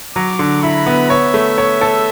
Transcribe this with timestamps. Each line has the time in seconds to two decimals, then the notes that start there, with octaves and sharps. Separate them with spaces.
0.15 F#3 D6
0.39 D3
0.63 E4 B5
0.86 B3
1.10 C#5 E5
1.34 A3
1.58 C#5
1.81 A4